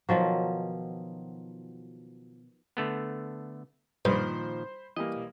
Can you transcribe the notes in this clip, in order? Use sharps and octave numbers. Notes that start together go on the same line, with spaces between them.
B2 D#3 F3 F#3
D3 A3 B3
G2 A#2 D#3 F3 C5 B5
E3 G3 A#3 D#5